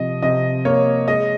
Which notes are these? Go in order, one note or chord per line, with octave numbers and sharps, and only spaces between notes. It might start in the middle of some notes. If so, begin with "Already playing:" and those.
Already playing: C3 F3 D#5
C3 D#5
A#3 C#5
G#3 D#5